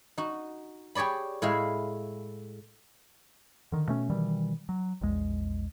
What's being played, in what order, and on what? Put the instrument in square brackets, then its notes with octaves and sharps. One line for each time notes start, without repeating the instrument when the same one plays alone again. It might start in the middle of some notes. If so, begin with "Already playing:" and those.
[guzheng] D#4 F#4
G4 G#4 C#5 D5 B5
A2 G#3 E4 G#4 F5
[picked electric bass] D3 D#3
B2 A3 C#4
B2 D#3 E3 G3
F#3
A#1 E2 G#3